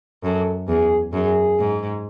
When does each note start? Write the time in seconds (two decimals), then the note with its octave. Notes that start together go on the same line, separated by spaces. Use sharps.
0.23 F#2 A4
0.68 E2 G#4
1.13 F#2 G#4
1.59 G#2